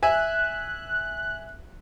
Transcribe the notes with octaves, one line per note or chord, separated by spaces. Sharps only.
E5 G#5 F#6